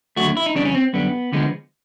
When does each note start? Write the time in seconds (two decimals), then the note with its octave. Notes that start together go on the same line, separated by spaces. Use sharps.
0.16 D#2 D3 F#3 A3 F#4
0.37 E4
0.46 D#4
0.55 F2 C#3 E3 G3 D4
0.65 C#4
0.75 C4
0.93 F#2 D3 G3 B3
1.32 D2 D3 F3 G#3 B3